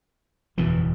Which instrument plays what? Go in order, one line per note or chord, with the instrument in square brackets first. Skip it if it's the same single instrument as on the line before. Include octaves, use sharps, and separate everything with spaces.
[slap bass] F#1 E2 B2 E3